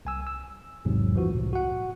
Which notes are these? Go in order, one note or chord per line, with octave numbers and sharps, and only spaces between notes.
C2 G#5 E6
E6
A1 E2 G#2 C3 F#3
G2 E3 F3 F#4
C2 A2 C3
F#4 F#5